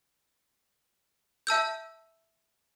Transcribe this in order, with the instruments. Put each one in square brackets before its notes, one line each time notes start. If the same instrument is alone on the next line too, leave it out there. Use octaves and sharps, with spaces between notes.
[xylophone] E5 A5 E6 G6